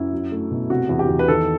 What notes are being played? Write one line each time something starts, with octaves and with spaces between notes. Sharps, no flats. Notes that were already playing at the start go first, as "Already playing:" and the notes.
Already playing: F#2 E4
F#3
A3
B2
C3 F#4
E2
G4
E2
B4
D#3 A4